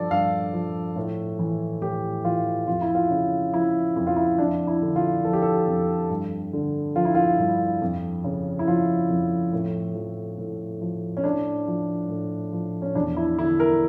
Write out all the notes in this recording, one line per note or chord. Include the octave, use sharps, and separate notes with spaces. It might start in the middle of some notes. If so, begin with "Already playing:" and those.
Already playing: G2 F3 A4 D5
G2 F5
F3
A2
E3
A2 G4
E3 F4
F2 F4
E4
F4
C#3
F3 E4
F2 E4
F4
E4
F2 D4
E4
D3
F4
F3 A4
G4
A4
F2
G2
D3
F3 F4
E4
F4
G2
F2
C#3
E4
F3 F4
F2
A2
F3
A2
F3
C#4
A2 D4
F3
A2
F3
C#4
E2 D4
E4
D3 E4
A#4